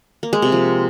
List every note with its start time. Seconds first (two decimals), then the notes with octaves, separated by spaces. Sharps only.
0.23 A#3
0.33 G#3
0.42 C3
0.52 F3